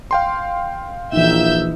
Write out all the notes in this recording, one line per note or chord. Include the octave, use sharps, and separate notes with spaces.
F5 G5 C6
A#1 E3 D#4 E5 E6 G6